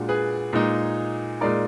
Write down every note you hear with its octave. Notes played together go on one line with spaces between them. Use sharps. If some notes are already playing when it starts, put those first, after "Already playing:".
Already playing: A#2 G#3 D4 F#4
G#4 B4
A#2 G#3 D#4
A#2 G#3 D#4 A#4 D5